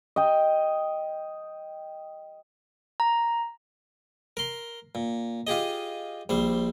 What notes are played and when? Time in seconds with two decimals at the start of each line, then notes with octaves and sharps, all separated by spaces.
0.16 D#5 G5
3.00 A#5
4.37 A#4 C6
4.95 A#2
5.47 F4 G4 G#4 D#5
6.29 A#1 G3 C5